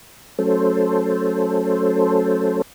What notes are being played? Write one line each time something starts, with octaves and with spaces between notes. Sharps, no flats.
F#3 A3 C#4 A4 C5